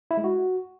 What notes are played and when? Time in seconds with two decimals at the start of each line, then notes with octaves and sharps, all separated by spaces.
0.11 E4
0.17 G#3
0.24 F#4